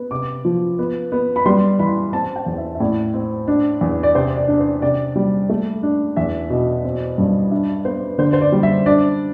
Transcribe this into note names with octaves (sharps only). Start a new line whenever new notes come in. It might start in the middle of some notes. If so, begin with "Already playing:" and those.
Already playing: B3
C3 D6
F3
B3
B3
B5
G3 C6
E3 B5
C4 A5
G5
E2
E5
E5
A2 D5
C4
D4
E2
D5
C3 C5
D5
D4
C5
C3 D5
G3
A3
D4
E2 E5
B2
C4
G2
D4 E5
B3 C5
D3 C5
C5
D5
G3
E5
D4 D5